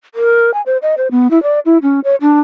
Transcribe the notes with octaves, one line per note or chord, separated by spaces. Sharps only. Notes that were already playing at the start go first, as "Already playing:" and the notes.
A#4
G#5
C5
D#5
C5
B3
E4
D5
E4
C#4
C#5
D4